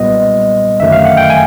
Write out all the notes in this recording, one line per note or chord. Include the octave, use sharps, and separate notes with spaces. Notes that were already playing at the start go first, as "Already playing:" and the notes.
Already playing: B1 A#2 G3 B3 D#5
G1 F#2 D#3 F#3 A3 E5
F5
F#5
G5
G#5